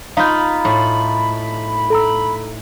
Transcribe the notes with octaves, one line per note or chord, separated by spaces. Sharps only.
D#4 F4 F5 A#5 B5 G6
A2
A4 A#5 E6